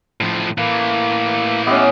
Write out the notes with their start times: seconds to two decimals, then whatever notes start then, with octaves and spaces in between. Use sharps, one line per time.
0.21 A2 F3
0.58 A2 E3 A#3
1.67 B3 C#4 G4 D#5 E5